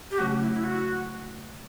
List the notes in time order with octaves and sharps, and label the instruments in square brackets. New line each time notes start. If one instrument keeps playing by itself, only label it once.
[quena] G4
[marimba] C#3 F#3 A3 C#4 [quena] F#4
[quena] E4
E4
F#4